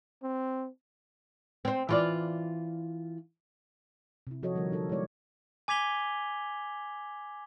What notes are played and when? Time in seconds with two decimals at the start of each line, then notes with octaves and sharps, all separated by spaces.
0.23 C4
1.65 C4 C5
1.89 E3 F4 D5
4.27 C3 E4
4.43 F3 F#4 A4 C#5 D#5
4.55 D3 F3 G3 D#4 A#4
4.70 D3 F#3 D#4 A4 A#4
4.89 G#3 B3 E4 C#5 D5
5.68 G#5 D6 G#6 B6 F7 G7